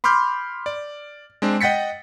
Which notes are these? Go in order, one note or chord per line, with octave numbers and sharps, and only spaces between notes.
B5 C6 D6 F6 G6
D5
G#3 C4 D4
D#5 F#5 G5 A6 B6 C#7